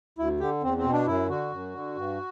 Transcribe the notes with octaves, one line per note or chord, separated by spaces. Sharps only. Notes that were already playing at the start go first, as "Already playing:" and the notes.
D2 E4
D3 G4
E2 C4
C4
B2
D4
F#2 E4
D3 F#4
F#2
D3
G2